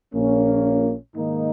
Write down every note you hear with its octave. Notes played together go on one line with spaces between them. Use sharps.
A#1 A#2 A#3 C#4
G#2 D#3 A#3 D#4